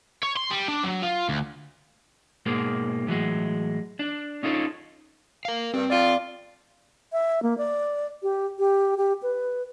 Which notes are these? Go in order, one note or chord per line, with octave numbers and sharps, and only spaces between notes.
C#5
C6
G3
D4
F#3
F4
D2
G#2 B2 G#3 A#3
A2 E3 F#3 G#3
D4
C#4 D#4 F4 A4 C#5
A#4 F5
G2 C4
F2 F4 D5
E5
A#3
D5
G4
G4
G4
B4